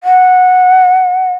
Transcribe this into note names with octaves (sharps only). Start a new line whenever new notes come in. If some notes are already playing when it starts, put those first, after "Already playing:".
F#5